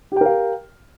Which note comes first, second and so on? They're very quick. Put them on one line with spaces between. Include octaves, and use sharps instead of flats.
G4 G5 A#4 F5